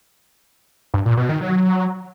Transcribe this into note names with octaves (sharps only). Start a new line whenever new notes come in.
G2
A#2
B2
D#3
F#3